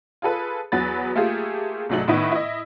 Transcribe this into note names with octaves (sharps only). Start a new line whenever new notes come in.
F4 G#4 A4 B4
E2 F#3 B3 B4 A6
A3 A#3 F4 G4 G#4
C2 G#2 F#3 A3 F#7
A2 D#3 B3 E4 B4 D#5
E4 D#5